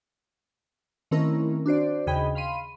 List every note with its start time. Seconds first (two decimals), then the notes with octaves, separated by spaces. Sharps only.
1.11 D#3 A3 C4 C#4 E4 A#4
1.66 D4 F#4 C5 D5
2.07 D#2 C#3 G#4 D#5 G5 B5
2.35 F5 B5 C6 D#7